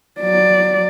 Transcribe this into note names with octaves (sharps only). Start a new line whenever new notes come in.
F#3 D5